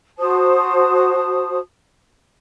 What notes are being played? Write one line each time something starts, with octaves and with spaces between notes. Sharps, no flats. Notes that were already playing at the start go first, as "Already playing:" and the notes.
F#4 C5 A5 D#6